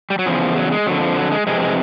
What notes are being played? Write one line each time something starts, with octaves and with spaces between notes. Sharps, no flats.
G3
F#3
E2 C#3 F3
F#3
G#3
F2 D3 F#3
F3
F#3
G#3
F2 C3 E3 G#3
G#3